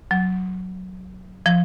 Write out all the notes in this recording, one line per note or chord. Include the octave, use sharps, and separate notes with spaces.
F#3
F3